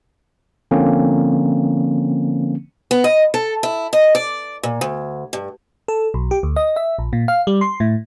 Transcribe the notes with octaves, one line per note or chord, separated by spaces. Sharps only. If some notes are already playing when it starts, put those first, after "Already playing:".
D3 F3 A#3 C4 C#4
B3
D#5
A4
E4
D#5
D5
A#2
D2
G2
A4
B1
G4
D2
D#5
E5
A#1
A#2
F5
G3
C6
A2